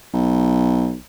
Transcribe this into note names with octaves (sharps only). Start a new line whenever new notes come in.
B1